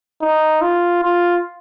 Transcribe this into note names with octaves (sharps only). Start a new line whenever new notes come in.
D#4
F4
F4